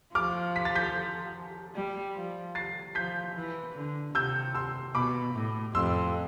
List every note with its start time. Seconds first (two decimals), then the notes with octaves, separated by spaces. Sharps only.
0.15 F3 D6 F6
0.56 B6
0.65 A6
0.75 G6 B6
1.75 G3
2.15 F3
2.55 A6 C7
2.95 F3 G6 B6
3.35 E3
3.75 D3
4.14 C3 E6 G6
4.55 C6 E6
4.94 B2 B5 D6
5.34 A2
5.75 F2 C6 E6